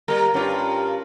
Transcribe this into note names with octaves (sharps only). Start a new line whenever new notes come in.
G3 A#3 A#4
G2 C#4 F4 D6